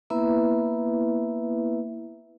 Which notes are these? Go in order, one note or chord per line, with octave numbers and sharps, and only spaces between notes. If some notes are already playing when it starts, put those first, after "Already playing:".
A#3 B3 E4 B4 E5